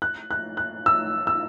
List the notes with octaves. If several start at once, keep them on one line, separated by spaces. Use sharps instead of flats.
F#6
F#6
F#6
E6
E6